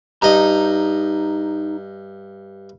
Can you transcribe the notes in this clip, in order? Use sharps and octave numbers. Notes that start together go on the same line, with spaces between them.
G2 D#4 D#5 A#5